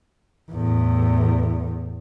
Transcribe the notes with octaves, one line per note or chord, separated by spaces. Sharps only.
E2 A2